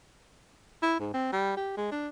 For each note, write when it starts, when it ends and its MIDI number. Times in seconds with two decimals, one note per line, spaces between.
0.83 0.96 64
1.00 1.11 44
1.14 1.30 60
1.33 1.55 55
1.57 1.76 67
1.77 1.90 56
1.92 2.08 62